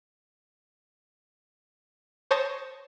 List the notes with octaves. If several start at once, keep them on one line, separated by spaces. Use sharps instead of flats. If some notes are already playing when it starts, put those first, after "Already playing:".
C5 C#5 A5 D#6 A#6